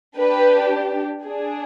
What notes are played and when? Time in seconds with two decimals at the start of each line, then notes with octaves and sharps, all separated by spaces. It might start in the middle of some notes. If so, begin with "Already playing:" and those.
0.17 D4 G4 B4
1.24 D4 G#4